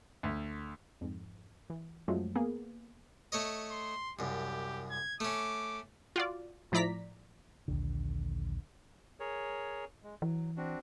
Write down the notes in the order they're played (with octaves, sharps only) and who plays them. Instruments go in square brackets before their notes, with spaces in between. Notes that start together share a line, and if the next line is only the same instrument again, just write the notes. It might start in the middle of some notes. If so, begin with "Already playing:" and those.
[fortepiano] D2
[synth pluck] F2 G#2
E3
F#2 F3 F#3 G#3 A3
A#3 B3 G#4
[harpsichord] A3 C#5 D#5
[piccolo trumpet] C6
[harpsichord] C2 F#2 [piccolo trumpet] G4
[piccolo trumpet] G#6
[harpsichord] A3 C#4 [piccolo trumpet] D6
[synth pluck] F4 F#4 D5
A2 F3 E4 D5 A#5 B6
[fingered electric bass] A#1 D#2 D3
[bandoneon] G#4 A#4 C#5
G#3
[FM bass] E3 [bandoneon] F#3
[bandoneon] C4 D4 F#4